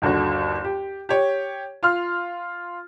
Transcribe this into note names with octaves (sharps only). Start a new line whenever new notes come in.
G1 D#2 D3 F#4
G4
G4 C#5
F4 C6 F6